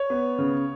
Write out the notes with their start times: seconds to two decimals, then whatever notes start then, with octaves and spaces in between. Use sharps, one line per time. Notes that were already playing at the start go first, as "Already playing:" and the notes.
Already playing: C#5
0.10 B3
0.38 C#3